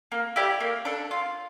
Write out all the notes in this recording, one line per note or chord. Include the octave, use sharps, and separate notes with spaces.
A#3
E4 G4 D5
A#3
D4 A4
F4